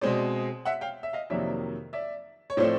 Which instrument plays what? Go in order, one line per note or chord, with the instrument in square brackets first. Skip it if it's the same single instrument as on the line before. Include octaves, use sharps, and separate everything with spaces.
[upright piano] B2 G#3 C4 C5 D5
E5 F#5
F5 G5
E5
D#5 F5
F2 C3 D#3 F#3 A#3 D5 E5
D5 E5
C#5
A2 F3 A3 C4 C5 D5